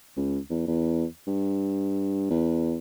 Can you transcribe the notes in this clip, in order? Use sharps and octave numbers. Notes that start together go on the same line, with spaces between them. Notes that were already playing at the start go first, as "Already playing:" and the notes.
C#2
E2
E2
G2
E2